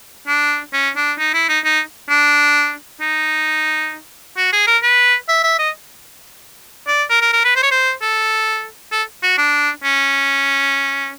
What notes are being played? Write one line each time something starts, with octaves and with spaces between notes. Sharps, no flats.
D4
C#4
D4
D#4
E4
D#4
D#4
D4
D#4
F#4
G#4
A#4
B4
E5
E5
D#5
D5
A#4
A#4
A#4
B4
C5
C#5
C5
A4
A4
F#4
D4
C#4